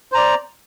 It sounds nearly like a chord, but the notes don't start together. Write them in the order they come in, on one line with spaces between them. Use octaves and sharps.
C5 A#5 D5